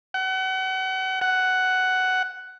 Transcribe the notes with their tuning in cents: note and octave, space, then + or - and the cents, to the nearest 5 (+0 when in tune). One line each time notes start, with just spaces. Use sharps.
F#5 +35
F#5 +10